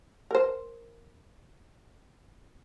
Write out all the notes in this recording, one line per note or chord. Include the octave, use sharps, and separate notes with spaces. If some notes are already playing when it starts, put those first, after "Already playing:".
A#4 C5